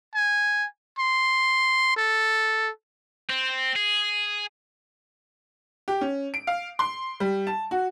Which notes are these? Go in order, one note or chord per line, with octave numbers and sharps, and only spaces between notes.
G#5
C6
A4
C4
G#4
G4
C#4
D7
F5
C6
G3
A5
F#4